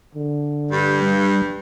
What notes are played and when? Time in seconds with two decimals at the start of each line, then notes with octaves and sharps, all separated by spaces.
0.15 D3
0.71 G2
1.01 G3